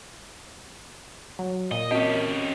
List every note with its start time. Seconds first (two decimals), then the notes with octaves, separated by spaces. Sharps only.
1.39 F#3
1.72 A#2 D#5
1.91 C4 C#4 G4 A#4 D#5